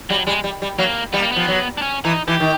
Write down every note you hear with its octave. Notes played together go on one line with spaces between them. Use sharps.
F#3 G3
G3 G#3
G3
G3
F#3 A#3
G3 B3
A#3
F3 B3
F#3
D4
C#4
E3 D#4
E3 G4
D#3